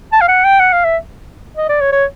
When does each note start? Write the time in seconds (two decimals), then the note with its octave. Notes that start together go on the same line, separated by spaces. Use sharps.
0.12 A5
0.21 F5
0.29 F#5
0.44 G5
0.60 F#5
0.73 F5
0.84 E5
1.57 D#5
1.69 D5
1.81 C#5
1.92 C#5